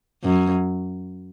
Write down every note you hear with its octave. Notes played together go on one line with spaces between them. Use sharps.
F#2